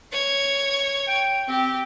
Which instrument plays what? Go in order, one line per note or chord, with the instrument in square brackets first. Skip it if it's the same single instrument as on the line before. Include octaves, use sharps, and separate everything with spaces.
[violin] C#5 G#6
[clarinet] G5
[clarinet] C4 [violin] G4